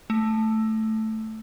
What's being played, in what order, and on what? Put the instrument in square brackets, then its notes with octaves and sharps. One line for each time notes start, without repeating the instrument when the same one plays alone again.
[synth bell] A3